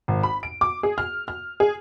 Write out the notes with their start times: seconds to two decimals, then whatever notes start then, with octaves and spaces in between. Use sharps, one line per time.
0.08 G#1
0.23 B5
0.43 D7
0.61 D6
0.83 G#4
0.98 F6
1.28 F6
1.60 G#4